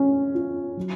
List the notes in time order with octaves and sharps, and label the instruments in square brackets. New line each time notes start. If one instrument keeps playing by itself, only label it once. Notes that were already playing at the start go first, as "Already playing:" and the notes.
Already playing: [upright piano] C#4
F4
F#3